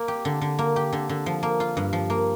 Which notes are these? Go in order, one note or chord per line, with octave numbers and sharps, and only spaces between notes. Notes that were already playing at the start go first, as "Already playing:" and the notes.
Already playing: A#3
G4
D3
D3
A#3
G4
D3
D3
F3
A#3
F4
G2
F3
A#3